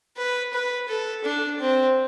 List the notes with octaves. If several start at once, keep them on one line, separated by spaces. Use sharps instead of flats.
B4
B4
A4
D4
C4